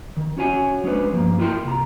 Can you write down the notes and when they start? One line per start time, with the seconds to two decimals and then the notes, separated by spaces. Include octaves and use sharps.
0.16 D#3
0.37 C#4 F#4 C#5 G#5
0.84 G#3 C#4 D4 B4 C5
1.12 G2 F3 A#3
1.38 E4 F4 A#4 F#5 G5 C6
1.64 C2 A#5